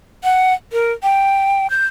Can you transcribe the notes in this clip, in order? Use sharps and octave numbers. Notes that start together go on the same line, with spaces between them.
F#5
A#4
G5
G6